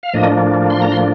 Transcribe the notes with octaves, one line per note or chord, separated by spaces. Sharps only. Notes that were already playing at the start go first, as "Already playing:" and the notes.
F5
A2 F3 A#3 D4 D#5
C6
A#5
C6